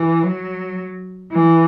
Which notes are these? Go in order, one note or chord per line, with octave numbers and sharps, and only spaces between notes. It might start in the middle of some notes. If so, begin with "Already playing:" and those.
Already playing: E3
F#3
E3